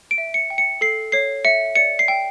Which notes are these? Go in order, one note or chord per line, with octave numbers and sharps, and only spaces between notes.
D7
E5
C#7
G5
C#7
A4 C7
C#5 C7
E5 C#7
D5 C#7
C7
G5